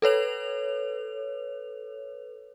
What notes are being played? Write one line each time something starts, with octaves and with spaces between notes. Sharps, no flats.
A4 B4 C#5 F7